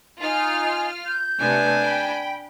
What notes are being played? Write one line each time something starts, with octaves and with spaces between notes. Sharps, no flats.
D#4 F4 G#5 F6
G6
C3 A3 B3 D4 G#5
G5 B5